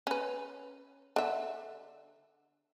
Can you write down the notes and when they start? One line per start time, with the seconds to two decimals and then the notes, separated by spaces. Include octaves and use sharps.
0.07 C#4 B4
1.16 D3 E5